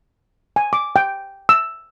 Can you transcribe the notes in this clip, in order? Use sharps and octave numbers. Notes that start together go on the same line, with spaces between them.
G#5
D6
G5
E6